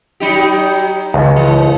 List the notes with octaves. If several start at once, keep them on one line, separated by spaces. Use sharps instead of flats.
F#3 D#4 G4
C#2
E3